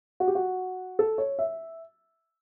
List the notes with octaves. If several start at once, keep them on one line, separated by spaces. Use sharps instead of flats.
F#4
G4
F#4
A4
C#5
E5